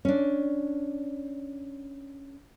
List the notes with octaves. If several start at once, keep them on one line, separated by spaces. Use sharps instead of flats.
C#4 D4